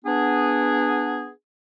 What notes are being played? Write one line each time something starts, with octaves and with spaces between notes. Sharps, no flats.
B3 D4 G#4